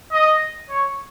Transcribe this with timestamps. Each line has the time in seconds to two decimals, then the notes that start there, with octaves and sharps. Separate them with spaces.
0.12 D#5
0.70 C#5